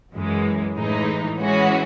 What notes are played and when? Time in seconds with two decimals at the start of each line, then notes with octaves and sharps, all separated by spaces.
0.12 F#2 E3 G#3
0.75 A2 E3 G#3 D#4
1.38 E3 G#3 C#4 F#4